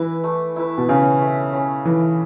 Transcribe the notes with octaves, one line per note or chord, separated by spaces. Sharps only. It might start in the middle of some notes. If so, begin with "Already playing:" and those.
Already playing: E3 E4 B4
A3
E4 B4
B2
C#3 C#4
A4 E5
C#4
E3 A4 E5